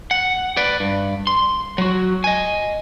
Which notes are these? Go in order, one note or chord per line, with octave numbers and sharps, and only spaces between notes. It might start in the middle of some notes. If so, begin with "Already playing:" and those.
F#5
B4 D5
G2
C6
F#3 F#4
D#5 G#5